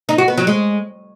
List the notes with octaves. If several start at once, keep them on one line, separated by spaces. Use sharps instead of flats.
D#4
F#4
B3
F#3
G#3